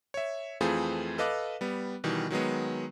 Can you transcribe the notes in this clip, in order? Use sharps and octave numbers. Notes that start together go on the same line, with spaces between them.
C#5 E5
F2 E3 A3 C4 F4 G#4
A4 B4 D#5 F5 D6 F#6
G3 B3
B2 D#3 E3 G3
D#3 F#3 G#3 B3